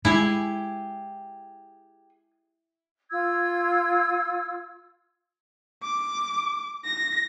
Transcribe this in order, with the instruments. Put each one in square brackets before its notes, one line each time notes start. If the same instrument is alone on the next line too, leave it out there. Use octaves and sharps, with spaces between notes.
[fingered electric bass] G#3 [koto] E4 [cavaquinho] G4 G#4
[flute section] F4 E6 G#6
[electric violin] D6
A#6